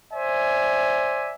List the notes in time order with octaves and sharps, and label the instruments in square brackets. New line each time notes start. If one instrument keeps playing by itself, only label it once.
[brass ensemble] C5 D5 E5 G#5